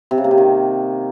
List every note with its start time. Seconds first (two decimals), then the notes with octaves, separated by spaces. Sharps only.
0.11 C3
0.18 C#3
0.24 A#3
0.31 C3
0.38 D#3